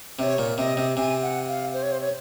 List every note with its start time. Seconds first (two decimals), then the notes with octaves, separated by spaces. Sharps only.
0.19 C3 D#5
0.23 C#5
0.38 A#2
0.58 C3 D#5
0.77 C3
0.96 C3 G#5
1.22 F#5
1.48 F5
1.73 C5
1.82 C#5
1.91 C5
2.00 C#5